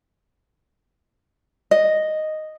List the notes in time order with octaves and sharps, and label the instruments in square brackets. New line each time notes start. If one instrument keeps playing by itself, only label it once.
[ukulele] D#5